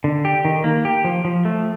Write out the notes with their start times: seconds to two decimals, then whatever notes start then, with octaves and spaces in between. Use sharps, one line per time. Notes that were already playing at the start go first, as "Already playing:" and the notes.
0.04 D3
0.25 G4
0.45 D#3
0.64 A#3
0.85 G4
1.05 F3
1.25 F3
1.45 A3